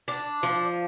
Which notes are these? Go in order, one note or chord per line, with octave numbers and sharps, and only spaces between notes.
D4
F3